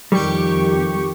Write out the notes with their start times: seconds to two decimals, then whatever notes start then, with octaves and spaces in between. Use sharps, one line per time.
0.12 F2 D#3 G3 G4 C#6